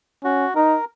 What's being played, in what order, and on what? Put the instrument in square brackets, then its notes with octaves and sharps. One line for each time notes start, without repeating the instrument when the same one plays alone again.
[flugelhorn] C#4 [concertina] F#4
[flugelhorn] D#4 [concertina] A#4